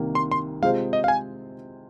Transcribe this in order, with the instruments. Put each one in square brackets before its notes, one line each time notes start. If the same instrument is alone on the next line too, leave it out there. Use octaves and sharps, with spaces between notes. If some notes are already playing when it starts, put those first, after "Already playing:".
Already playing: [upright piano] C2 C3 D#3 A#3
[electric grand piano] C6
C6
[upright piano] C3 G#3 F4 G#4 C5 [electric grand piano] F5
[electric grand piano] D#5
F5
G#5